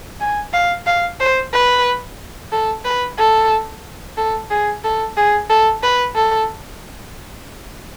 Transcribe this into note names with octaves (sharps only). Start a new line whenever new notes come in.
G#5
F5
F5
C5
B4
A4
B4
A4
A4
G#4
A4
G#4
A4
B4
A4